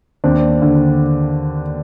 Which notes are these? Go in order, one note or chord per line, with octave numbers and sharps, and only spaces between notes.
D#2 C4 D4
D3